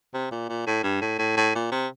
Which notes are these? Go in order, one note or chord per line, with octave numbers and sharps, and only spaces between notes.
C3
A#2
A#2
A2
G2
A2
A2
A2
A#2
C3